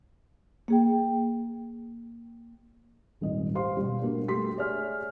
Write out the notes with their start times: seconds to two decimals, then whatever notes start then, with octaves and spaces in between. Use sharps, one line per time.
0.68 A#3 G#4 G5
3.21 D#1 G#1 D#5
3.55 G4 C5 F5 C6
3.77 B2 G3
4.02 G3 A#3 D4 F#4
4.28 A3 G4 C6 B6
4.57 G#4 C#5 D5 E5 G#5 F6